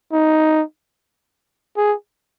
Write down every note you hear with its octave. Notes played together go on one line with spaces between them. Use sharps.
D#4
G#4